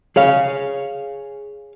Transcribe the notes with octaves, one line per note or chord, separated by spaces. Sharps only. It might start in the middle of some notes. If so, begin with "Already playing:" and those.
G#4 C#5 F5